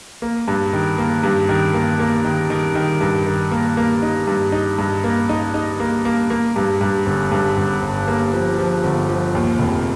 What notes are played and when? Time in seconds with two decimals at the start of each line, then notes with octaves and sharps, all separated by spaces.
0.22 A#3
0.48 G2
0.73 D#3
0.98 A#3
1.23 G2
1.49 D#3
1.74 A#3
2.00 A#3
2.25 D#3
2.50 D#3
2.75 D#3
3.01 G2
3.27 D#3
3.51 A#3
3.77 A#3
4.02 D#4
4.27 G2
4.52 D#4
4.78 G2
5.04 A#3
5.29 D#4
5.54 D#4
5.80 A#3
6.05 A#3
6.30 A#3
6.56 G2
6.81 G2
7.06 G1
7.32 G2
7.57 G1
7.82 G1
8.08 A#3
8.34 F3
8.58 F3
8.84 G1
9.09 F3
9.35 D#2
9.59 F1